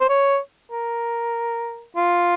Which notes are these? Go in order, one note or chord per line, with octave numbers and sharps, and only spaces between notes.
C5
C#5
A#4
F4